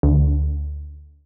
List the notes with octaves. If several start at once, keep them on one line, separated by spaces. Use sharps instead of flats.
D2